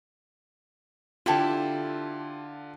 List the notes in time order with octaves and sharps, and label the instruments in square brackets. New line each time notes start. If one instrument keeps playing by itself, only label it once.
[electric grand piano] D3 F4 [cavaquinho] E4 G4 A4